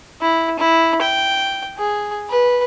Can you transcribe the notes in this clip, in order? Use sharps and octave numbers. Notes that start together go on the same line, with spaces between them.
E4
E4
G5
G#4
B4